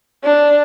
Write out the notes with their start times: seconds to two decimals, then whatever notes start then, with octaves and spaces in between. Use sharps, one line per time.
0.24 D4